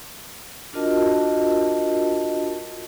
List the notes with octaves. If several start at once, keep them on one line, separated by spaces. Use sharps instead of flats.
D4 F4 F#4 A#4 D#5 A5